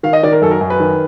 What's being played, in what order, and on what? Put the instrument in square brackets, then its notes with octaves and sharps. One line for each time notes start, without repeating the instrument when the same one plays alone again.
[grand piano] D#3 F5
D#5
D#3 D5
A#4
F#2 A4
A#4
F#2
B4
D#3